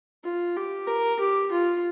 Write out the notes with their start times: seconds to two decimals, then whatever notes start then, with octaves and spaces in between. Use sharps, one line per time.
0.24 F4
0.56 G4
0.87 A#4
1.19 G4
1.52 F4